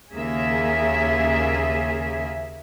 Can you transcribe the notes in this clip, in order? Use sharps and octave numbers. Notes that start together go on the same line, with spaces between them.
D#2 C#3 A#3 G#4 E5